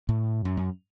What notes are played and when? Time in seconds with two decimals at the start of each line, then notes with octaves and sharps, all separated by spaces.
0.09 A2
0.45 F#2
0.57 F#2